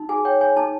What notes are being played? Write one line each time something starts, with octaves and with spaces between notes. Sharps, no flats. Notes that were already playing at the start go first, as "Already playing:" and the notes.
Already playing: D#4
G#4 G#5
C#5 G5
C#5 G#5
D#4 A5